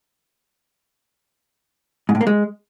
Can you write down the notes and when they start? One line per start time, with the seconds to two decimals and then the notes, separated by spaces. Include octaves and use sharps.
2.09 G#2
2.15 A2
2.21 A#3
2.27 G#3